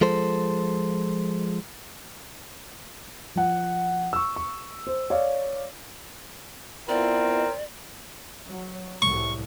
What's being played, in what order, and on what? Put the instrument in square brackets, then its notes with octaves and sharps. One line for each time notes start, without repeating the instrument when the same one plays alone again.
[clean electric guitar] F3 G#3 A4 C5
[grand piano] F3 F#5
C#6 E6
C#6
C5
C#5 D5 F5
[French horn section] B3 E4 F4 [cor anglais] C4 [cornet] A#4 [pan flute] D5
[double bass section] F#3
[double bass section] C2 A2 [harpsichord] C#6